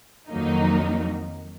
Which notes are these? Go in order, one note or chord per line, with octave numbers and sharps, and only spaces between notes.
F2 D#3 F#3 A#3 D#4